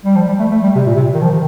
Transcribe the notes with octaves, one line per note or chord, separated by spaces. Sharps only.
G3
F3
G3
A3
A3
G3
C3
A#2
C3
D#3
F3
D#3